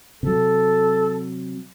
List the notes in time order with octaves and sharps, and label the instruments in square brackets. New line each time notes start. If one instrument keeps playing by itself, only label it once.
[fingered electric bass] C3 F#3 [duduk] A4